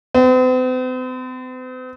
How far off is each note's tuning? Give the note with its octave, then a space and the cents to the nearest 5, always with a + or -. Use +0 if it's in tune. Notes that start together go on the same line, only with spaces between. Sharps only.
C4 -45